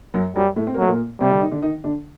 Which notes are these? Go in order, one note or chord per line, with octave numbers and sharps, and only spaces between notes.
F#2 F#3
F#2 F#3 G3
A2 A3
C4
A#3
F#3 A3
A#2 A#3
C3 G3 C4
D3 D4
D#3 D#4
D3 D4
D#3 D#4
D3 D4